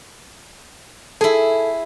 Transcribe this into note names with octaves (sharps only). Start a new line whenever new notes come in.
E4 G#4 A4